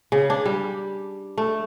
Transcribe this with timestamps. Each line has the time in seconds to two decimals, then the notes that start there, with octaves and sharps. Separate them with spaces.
0.12 C#3
0.30 D4
0.46 G3
1.38 A3